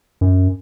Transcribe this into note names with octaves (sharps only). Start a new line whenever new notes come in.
F#2